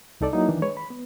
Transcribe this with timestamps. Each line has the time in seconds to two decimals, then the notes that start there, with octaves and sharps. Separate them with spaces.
0.21 C2 D#4 A4 D5
0.33 F#3 A#3 D#4 E4
0.49 D#3 E3 D4
0.62 G#3 B4 C#5
0.77 B5
0.90 B3